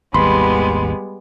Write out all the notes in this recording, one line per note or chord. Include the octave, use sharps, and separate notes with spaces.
G#1 D#2 G3 G#3 B3 B5 C6